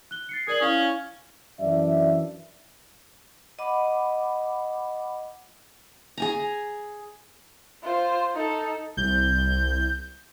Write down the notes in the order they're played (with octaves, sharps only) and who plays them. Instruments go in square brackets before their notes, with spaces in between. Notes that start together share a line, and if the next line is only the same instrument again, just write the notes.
[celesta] F#6 G7
A6 C7 C#7
[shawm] G#4 [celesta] A#4 D5 F#7
[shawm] C#4 [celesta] E4 F5 F6
[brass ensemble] F#2 E3 D4 D5 E5
[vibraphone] D#5 F#5 B5 D6
[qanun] G#4 G#5 A#5
[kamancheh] F4 C5
D#4 A4
[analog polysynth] C2 [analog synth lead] G6